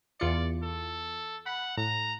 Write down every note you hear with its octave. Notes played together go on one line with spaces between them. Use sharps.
E2 F4 D5 C#7
A4
F#5 B5
A2 A#5